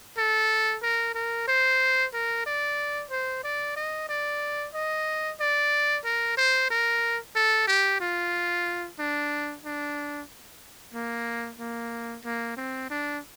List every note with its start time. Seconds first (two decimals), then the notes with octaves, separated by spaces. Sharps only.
0.18 A4
0.82 A#4
1.15 A#4
1.48 C5
2.13 A#4
2.46 D5
3.10 C5
3.44 D5
3.76 D#5
4.09 D5
4.74 D#5
5.40 D5
6.05 A#4
6.37 C5
6.70 A#4
7.35 A4
7.67 G4
8.00 F4
8.99 D4
9.64 D4
10.94 A#3
11.59 A#3
12.24 A#3
12.57 C4
12.90 D4